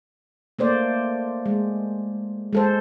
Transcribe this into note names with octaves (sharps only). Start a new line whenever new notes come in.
A3 A#3 C5 D5
G#3
G#3 A4 C5